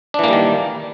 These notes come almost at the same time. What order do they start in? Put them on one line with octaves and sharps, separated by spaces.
D4 E3 A#3 G3 D#3